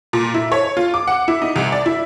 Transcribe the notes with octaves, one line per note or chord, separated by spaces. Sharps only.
A#2
E4
C#5
F4
D6
F#5
E4
D#4
C2
D5
E4